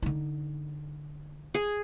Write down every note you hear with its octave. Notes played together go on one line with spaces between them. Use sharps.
D3 D#4
G#4